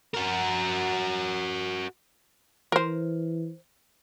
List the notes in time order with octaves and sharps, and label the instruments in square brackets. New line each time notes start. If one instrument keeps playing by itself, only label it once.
[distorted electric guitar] F#4 A#4
[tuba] E3 [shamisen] A#4 C5